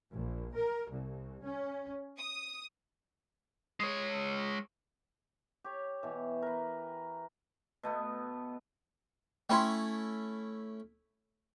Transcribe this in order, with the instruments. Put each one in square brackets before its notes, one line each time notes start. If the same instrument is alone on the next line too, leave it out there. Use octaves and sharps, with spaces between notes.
[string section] A#1
A#4
C2
C#4
D#6
[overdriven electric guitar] G#3 C#5
[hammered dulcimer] G4 C#5
B2 E3
A#4 B4
B2 A3 B3
[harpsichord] A3 C#4 E4 [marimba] G5 B5 C6